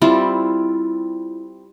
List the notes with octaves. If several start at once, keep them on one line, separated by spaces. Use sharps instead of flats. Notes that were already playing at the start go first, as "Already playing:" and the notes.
G3 C4 E4 F4